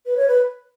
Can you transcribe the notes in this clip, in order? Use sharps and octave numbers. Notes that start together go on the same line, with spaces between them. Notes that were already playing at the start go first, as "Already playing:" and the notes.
B4
C#5
B4